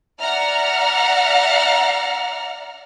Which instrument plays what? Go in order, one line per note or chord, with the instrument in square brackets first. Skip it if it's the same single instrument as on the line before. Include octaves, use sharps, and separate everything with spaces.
[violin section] D5 E5 F#5 A#5 F6